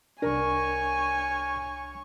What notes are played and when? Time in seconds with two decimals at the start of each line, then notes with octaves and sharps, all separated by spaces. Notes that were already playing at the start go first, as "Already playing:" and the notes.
0.22 C2 D4 A#4 C#5 G#5 C#6